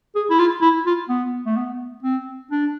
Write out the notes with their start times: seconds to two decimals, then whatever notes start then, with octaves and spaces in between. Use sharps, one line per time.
0.15 G#4
0.30 E4
0.39 F4
0.62 E4
0.86 F4
1.09 B3
1.46 A3
1.57 B3
2.03 C4
2.51 D4